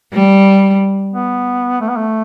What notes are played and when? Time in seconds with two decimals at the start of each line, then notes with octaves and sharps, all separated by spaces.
0.13 G3
1.13 B3
1.81 A3
1.89 B3
1.97 A3